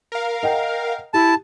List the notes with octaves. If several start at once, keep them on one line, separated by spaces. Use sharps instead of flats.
A#4 F5
D#5 F#5 G5
E4 G4 A5